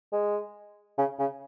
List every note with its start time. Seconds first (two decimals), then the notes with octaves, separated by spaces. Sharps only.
0.13 G#3
0.98 C#3
1.19 C#3